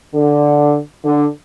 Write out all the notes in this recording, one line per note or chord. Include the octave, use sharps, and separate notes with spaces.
D3
D3